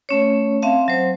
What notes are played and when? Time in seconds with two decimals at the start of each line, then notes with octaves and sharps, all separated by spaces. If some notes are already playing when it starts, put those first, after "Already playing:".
0.09 A3 C#4 C#5
0.62 C4 E5 F5 A5
0.88 F#3 C5